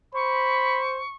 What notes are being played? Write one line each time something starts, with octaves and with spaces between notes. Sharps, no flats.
C5 B5 C#6